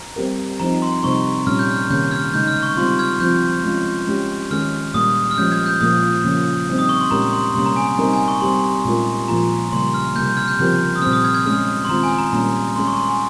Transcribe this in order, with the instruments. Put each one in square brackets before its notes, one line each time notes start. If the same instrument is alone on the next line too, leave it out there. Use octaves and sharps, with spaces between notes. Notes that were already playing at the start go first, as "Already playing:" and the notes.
Already playing: [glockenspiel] A#5
[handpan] G3 C4 G4 A#4
[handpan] F3 C4 D#4 [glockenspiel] A#5
[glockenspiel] C6
[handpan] C3 G3 C4 D#4 [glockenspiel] C#6
[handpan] A#2 G3 C#4 [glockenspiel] F6
[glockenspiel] G6
F6
[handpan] C3 D#3 A#3 C#4 [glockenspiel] G6
[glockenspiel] F6 G#6
[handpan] C#3 G#3 D#4 [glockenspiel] G6
[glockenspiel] F6
C#6
[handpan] G3 C4 F4 [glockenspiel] C6
[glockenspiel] F6 G#6
[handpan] F3 C4 F4 [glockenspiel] G6
[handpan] G#3 C#4 F4
G#3 C#4 G4
[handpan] D#3 G#3 C#4 G#4 [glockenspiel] F6
[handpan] A#2 G3 A#3 [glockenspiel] D#6
[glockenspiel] F6
[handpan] F3 G#3 C#4 G4 [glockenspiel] G6
[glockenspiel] F6 G#6
G6
[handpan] A#2 F3 A#3 F4 G#4 [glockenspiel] D#6
[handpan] C#3 F3 A#3 C#4
G3 C4 D#4
[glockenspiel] D#6
C#6
C6
[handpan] A#2 G#3 C#4 G4 A#4 [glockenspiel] A#5
[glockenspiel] C6
[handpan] C3 G3 A#3 C#4 [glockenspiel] C6
[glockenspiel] A#5
G#5
G#5
[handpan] G3 C4 D#4 A#4 [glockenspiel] A#5
[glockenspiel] G#5
C#6
[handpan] G3 C4 G4 [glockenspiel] C6
[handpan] A#2 G#3 C#4 F4 A#4
[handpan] A#2 F3 A#3 F4 [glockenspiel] A#5
[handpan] C#3 G3 A#3 [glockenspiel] C6
[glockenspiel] F6
[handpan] C3 G3 A#3 [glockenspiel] G6
[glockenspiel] G6
F6 G#6
G6
[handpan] C#3 F3 C4 G4 A#4 [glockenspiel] G6
[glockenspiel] D#6
[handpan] A#2 G3 C4 [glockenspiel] F6
[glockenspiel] D#6
F6 G#6
F6 G#6
[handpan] G#3 C#4 G#4 [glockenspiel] F6
[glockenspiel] C6
[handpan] D#3 G#3 C4 F4 [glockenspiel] A#5
[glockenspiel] G#5
A#5
[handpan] A#2 G3 A#3 C#4 [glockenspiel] A#5
[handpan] G#3 C#4 G#4 [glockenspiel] C6
[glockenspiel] C#6
C6
G#5